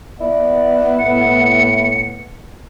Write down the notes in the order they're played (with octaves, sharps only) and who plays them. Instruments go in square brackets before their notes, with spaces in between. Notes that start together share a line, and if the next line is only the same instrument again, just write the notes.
[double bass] B3 [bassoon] E4 [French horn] D5
[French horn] A2 [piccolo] C#7